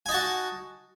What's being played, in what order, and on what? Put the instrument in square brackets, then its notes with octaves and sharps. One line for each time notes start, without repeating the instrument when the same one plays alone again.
[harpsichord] G#5
D#4
A5
F#4